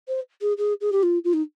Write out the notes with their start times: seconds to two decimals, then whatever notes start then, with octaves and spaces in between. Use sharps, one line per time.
0.08 C5
0.41 G#4
0.58 G#4
0.81 G#4
0.92 G4
1.03 F4
1.24 F4
1.33 D#4